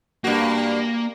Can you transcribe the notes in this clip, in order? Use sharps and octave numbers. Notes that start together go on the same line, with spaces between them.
G2 A#3 F#4